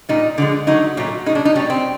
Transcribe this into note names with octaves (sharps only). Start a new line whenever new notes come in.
A#2 G3 D#4
D3 F3 G#3
D3 F#3 A3 D#4
A#2 F#3 A3
B2 G#3 D#4
D4
D#4
B2 G3 C#4
C4